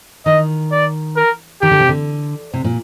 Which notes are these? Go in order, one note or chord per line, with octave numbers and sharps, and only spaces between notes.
D#3 D#5
D5
A#4
D#3 G4
D3
C3
D3
C3
A#2